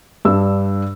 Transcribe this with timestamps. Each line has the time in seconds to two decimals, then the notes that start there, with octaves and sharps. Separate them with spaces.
0.25 G2 D4 E6